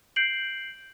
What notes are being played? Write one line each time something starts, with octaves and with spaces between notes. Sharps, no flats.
G6 C7 D7 F#7